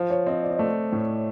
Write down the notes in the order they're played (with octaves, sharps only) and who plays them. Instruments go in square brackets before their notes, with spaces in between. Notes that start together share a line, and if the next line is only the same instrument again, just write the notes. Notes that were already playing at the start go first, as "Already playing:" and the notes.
Already playing: [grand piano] F3 [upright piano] C5
[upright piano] C#5
[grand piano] C4 [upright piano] D#5
[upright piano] D5
D#5
[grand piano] A3 [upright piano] D5
[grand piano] A2